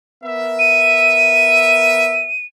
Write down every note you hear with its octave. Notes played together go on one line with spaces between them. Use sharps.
B3 A#4 E5
D#7